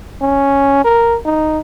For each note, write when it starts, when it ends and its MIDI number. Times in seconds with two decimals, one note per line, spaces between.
0.21 0.83 61
0.84 1.16 70
1.26 1.59 63